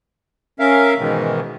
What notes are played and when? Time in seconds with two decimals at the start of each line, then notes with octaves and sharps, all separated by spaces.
0.59 C#4 A#4 E5 F5
0.99 G#2 B2 D#3 E3 G#3